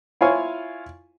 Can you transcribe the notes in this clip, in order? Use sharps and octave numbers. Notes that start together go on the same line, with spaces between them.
E4 F4 C#5 F5 G#5 C#6